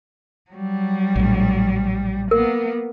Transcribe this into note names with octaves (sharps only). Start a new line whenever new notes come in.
F#3 G3
A#1 A2
A#3 B3 A#4